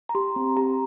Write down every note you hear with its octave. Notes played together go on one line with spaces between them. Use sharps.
A#5
G4 C6
C4
G4 A#5